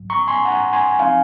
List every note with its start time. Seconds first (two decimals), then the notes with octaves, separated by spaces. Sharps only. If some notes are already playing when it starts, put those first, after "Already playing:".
Already playing: G#1 G#2 F#3
0.10 A#5 C#6
0.27 G#5 C6
0.45 F#5 A#5
0.73 G#5 C6
0.99 F3 C4 D#4 F5 G#5